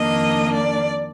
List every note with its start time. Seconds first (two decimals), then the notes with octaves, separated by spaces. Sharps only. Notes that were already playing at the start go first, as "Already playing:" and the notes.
Already playing: F2 D#3 A#3 D4 D#5
0.52 D5